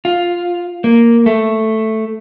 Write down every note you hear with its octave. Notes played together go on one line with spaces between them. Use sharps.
F4
A#3
A3